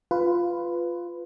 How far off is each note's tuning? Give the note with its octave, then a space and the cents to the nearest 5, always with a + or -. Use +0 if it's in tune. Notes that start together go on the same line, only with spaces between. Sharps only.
F4 +0 B4 +15